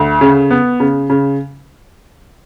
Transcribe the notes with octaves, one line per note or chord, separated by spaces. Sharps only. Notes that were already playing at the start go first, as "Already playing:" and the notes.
Already playing: D2
C#3
B3
C#3
C#3